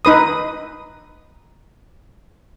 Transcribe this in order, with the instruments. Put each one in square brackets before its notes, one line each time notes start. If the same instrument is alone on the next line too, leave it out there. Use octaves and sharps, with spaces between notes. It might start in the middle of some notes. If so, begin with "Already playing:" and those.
[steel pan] D#4 B4 D#6